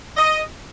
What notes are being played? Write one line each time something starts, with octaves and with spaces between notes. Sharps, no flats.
D#5